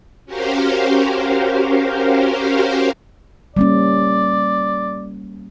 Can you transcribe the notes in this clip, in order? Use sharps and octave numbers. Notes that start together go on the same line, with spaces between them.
C#4 F#4 G4 A#4 C5 F5
G3 A#3 C#4 D5